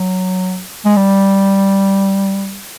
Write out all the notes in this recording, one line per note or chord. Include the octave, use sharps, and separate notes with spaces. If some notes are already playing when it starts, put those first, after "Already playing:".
Already playing: F#3
G#3
G3